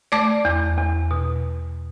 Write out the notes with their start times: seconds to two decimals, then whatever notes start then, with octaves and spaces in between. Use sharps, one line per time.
0.12 A3 D5 D6
0.45 E2
0.78 E2
1.11 B2